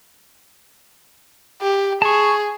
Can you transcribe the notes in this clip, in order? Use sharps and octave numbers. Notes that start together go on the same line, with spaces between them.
G4
G#4 A5 C#6